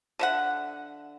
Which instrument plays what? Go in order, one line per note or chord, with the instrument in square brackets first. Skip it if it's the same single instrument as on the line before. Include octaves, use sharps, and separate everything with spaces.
[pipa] D3 E5 F#5